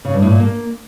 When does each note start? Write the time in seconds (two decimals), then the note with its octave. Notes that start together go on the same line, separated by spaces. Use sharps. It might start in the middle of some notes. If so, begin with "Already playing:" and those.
0.05 C#3
0.13 G2
0.22 A2
0.31 A#2
0.40 A#3